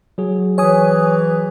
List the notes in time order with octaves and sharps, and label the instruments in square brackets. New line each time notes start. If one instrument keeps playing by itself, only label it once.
[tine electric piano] F#3 G#4
[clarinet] E3 [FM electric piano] C#5 G#5 D#6